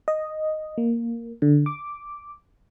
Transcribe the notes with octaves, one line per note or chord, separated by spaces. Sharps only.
D#5
A#3
D3
D6